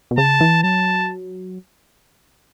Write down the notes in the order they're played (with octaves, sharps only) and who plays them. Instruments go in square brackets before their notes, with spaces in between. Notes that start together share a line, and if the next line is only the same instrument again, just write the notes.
[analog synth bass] B2
[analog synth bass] C#3 [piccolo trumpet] A5
[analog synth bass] E3
[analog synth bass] F#3 [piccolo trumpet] A5